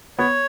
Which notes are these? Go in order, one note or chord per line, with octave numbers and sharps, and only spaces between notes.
B3 C#5